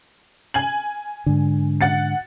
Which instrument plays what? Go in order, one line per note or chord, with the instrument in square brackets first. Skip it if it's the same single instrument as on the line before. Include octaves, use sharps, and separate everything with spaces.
[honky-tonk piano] G#5 G#6 F#7
[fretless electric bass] G#2 D3
[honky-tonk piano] F#5 A6 C#7